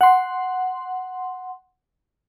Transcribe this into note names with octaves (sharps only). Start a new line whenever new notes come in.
F#5 C6